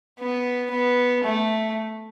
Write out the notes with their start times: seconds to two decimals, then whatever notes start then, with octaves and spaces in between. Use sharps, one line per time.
0.19 B3
0.71 B3
1.24 A3